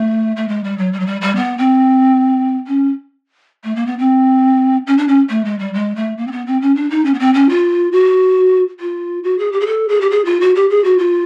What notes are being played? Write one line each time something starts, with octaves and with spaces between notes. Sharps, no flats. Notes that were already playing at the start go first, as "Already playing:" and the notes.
Already playing: A3
A3
G#3
G3
F#3
G3
F#3
G3
G3
B3
C4
C#4
A3
A#3
B3
C4
C#4
D4
C#4
A3
G#3
G3
G#3
A3
A#3
C4
B3
C4
C#4
D4
D#4
C#4
B3
C4
C#4
F4
F#4
F4
F#4
G#4
G4
G#4
A4
G#4
G4
G#4
F4
F#4
G4
G#4
F#4
F4